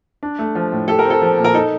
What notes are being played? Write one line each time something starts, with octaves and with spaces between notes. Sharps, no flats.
D4
A3
F3
A2
G4 A4
A#4
C4 A4
F3
A#2
A#4
D#4 A4